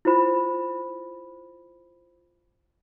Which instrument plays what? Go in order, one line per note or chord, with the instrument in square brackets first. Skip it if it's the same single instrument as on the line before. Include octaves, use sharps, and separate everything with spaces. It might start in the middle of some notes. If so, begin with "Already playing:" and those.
[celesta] E4 F4 C5 B5